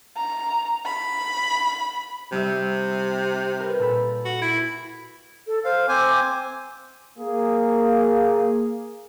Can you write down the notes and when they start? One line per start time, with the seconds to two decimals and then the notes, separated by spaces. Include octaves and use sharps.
0.17 A#5
0.86 B5
2.32 C3 G3 D#4 E5
3.60 A#4 B4
3.79 A#2 A4 B5
4.25 F#4
4.42 E4
5.47 A4
5.64 C5 F5
5.88 C4 C5 G#5 D6
7.19 A#3 G#4